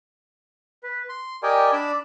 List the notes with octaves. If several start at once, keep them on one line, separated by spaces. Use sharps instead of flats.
B4
C6
G4 A#4 D5 D#5 G5 G#5
D4 D5 B5 E6